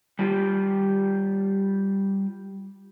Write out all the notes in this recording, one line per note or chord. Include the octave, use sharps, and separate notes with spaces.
G3 F4 G4